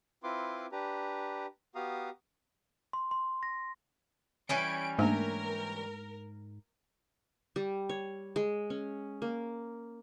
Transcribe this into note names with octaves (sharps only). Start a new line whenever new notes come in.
C4 E4 F4 B4 C6 D6
D4 G4 B4 A#5
B3 F#4 G4 F5 A#5 D#6
C6
C6
A#6
E3 G3 C#4 D7
G#2 A3 A#3 D4 A#4
G3
C#5
G#3
C#4
A#3